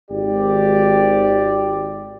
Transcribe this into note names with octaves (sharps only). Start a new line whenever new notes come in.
G#1 G4 D5